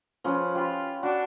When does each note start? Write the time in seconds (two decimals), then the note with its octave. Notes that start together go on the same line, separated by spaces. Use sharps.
0.24 F3 C#4 B4
0.55 F4 G4 B5
1.03 D4 F#4